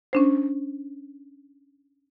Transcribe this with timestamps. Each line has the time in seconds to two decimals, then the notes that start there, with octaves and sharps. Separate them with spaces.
0.13 C#4 D4 C5